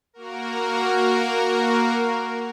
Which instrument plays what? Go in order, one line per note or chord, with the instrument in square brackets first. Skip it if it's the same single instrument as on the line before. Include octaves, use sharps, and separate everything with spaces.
[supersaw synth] A#3 F#4 A#4